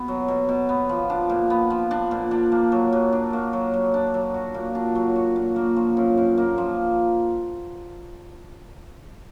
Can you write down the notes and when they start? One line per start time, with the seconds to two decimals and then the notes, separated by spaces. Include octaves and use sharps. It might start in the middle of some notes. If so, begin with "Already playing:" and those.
Already playing: B2 B3
0.08 F#3
0.28 B2
0.49 B2
0.69 B3
0.89 F3
1.10 D4
1.30 A#2
1.50 B3
1.70 F3
1.91 D4
2.11 A#2
2.31 D4
2.52 A#3
2.72 F#3
2.93 F#3
3.13 D4
3.33 A#3
3.53 F#3
3.74 F#3
3.94 D4
4.14 F#3
4.34 F#4
4.54 A#2
4.75 D4
4.95 F#3
5.16 F#4
5.36 A#2
5.56 A#3
5.76 F3
5.97 F#2
6.18 F#2
6.38 A#3
6.58 F3